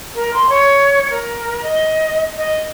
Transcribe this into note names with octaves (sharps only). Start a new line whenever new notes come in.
A#4
C6
C#5
A#4
D#5
D#5